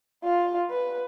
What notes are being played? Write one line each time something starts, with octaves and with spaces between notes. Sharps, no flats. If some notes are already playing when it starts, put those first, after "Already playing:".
F4
B4